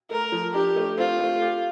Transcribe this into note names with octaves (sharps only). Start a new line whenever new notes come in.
A3 A#4
F3
D4 G4
A3
C4 F4
A3
G4